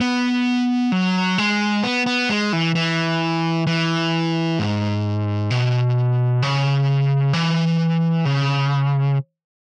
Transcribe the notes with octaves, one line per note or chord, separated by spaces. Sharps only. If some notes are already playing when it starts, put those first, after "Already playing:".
B3
F#3
G#3
B3
B3
G#3
E3
E3
E3
G#2
B2
C#3
E3
C#3